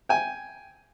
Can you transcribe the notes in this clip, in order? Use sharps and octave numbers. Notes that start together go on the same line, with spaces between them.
G5 G#5